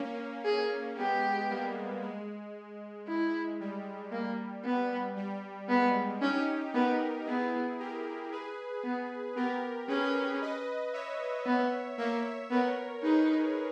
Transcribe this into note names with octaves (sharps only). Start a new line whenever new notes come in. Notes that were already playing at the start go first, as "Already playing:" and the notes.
Already playing: A#3 C#4
G#4
G#3 B3 G4
G3 A#3
G#3
E4
G3
A#3
B3
G3
G#3 B3
C#4 D#4 G4
B3 G4 A#4
B3 E4 G#4
G4 A#4
G#4 B4
B3
B3 G4 A#4
C#4 G#4 B4
B4 D#5
C#5 E5
B3
A#3 C#5 E5
B3 A#4 C#5
D#4 G#4 B4